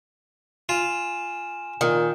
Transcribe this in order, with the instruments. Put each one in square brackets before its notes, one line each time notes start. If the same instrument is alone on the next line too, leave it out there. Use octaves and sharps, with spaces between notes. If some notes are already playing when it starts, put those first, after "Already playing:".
[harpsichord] F4 [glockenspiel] G#5 E7
[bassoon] A#2 [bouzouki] D#3